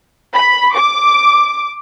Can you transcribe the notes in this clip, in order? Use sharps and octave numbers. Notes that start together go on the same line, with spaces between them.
B5
D6